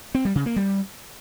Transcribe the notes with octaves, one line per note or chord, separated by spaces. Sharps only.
C4
G3
C#3
A#3
G3